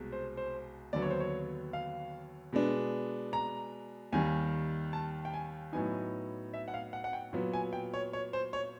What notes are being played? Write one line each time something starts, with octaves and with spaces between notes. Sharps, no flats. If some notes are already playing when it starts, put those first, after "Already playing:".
Already playing: C2 B2 G#3
C5
C5
D#2 D3 F#3 B3 D5
C#5
C5
C#5
F5
B2 G#3 B3 D4
A#5
D#2 D#3 G3 G#5
A5
G5
G#5
A2 F#3 B3 D#4 G#5
E5
F#5
F5
F#5
F#5
G5
A#2 F#3 B3
G#5
G5
C#5
C#5
C5
C#5